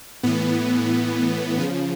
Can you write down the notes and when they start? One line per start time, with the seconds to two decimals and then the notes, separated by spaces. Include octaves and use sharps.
0.23 A2 E3 B3
1.57 C#3 F3